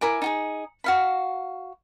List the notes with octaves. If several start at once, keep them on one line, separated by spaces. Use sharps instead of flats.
E4 A#4 G#5 D6
D#4 G4 G#4
F#4 F5 B5